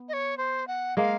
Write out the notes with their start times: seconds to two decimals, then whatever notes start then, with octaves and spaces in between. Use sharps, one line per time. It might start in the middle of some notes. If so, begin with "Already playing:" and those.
Already playing: B3
0.09 D#5
0.13 C#5
0.37 C5
0.67 F#5
0.97 G#3 A#3 F5